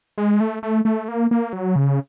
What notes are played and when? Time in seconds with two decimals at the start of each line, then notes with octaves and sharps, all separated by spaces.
0.18 G#3
0.40 A3
0.63 A3
0.85 A3
1.08 A#3
1.31 A#3
1.53 F#3
1.76 C#3